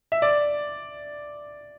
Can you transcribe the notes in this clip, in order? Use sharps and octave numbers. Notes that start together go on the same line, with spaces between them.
E5
D5